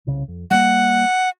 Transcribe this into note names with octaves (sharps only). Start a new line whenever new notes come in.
C2 C#3
F2
G3 G#3 A#3 F#5